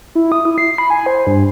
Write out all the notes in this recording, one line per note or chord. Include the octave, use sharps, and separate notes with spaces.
E4
D#6
E4
C7
B5
G#5
C5
G2